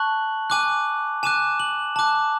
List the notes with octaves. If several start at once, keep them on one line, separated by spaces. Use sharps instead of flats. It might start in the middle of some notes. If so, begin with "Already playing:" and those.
Already playing: A5 C#6 F#6 F#7
G#5 D6 F#6
G#5 D6 F#6 E7
F#7
A5 D6 F#6